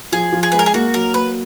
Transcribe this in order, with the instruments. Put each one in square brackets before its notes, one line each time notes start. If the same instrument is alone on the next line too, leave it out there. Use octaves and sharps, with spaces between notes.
[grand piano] F3 [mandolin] G#4
[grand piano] F3
[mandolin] G#4
[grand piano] G#3 [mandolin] B4
[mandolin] A#4
G#4
[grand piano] A#3 [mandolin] F#4
[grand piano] F#3 [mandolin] A#4
[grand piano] A#3 [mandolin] B4